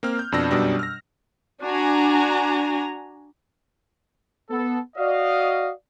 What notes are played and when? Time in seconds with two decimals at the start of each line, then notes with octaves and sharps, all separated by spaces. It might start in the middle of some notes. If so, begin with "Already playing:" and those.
0.03 A#3 C4 F6
0.19 G6
0.32 F2 B2 D4 E6 A#6
0.51 F#2 B2 G3 D4
0.79 F6 A#6
1.62 D4 F#4 G#5 A#5
4.49 B3 A4
4.97 F#4 D5 D#5 F5